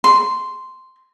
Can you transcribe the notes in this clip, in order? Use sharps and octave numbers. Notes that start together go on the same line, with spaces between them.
C6